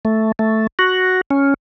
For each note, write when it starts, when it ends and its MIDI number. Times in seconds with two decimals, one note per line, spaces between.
0.05 0.32 57
0.39 0.67 57
0.79 1.21 66
1.31 1.54 61